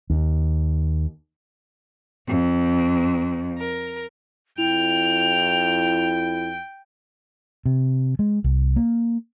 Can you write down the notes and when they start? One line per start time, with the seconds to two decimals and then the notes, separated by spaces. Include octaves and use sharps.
0.10 D#2
2.28 F2
3.59 A#4
4.58 F2 E4 G5 F7
7.66 C3
8.19 G#3
8.44 C2
8.76 A#3